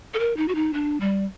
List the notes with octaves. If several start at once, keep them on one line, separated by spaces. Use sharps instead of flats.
A4
A#4
D#4
F#4
D#4
D4
G3